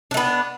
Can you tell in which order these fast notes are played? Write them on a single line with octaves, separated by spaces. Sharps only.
D4 A3 B3